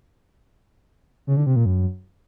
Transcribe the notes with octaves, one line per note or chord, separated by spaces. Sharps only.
C#3
D3
C3
A#2
F#2